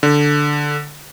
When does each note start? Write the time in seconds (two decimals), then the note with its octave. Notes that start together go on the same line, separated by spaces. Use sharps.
0.03 D3